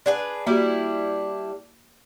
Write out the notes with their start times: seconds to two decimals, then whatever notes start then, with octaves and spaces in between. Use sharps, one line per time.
0.06 D4 G#4 B4
0.47 G3 A#3 D4 E4 F#4 G4